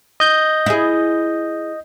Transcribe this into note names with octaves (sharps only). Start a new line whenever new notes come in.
D#5 G6
E4 G#4